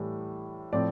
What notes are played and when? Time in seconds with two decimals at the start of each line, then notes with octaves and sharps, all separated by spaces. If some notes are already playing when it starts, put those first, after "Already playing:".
Already playing: A2 E3 G3
0.73 A2 F3 C4 D5